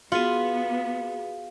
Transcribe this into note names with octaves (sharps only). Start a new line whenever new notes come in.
B3 F4 F#4 G#4